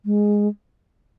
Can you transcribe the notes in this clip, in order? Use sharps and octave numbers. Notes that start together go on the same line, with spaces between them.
G#3